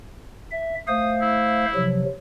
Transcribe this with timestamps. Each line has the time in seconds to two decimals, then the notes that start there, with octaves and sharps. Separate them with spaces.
0.51 E5
0.88 A3 C5 F5 D#6
1.22 E4
1.75 C3 F3 F#3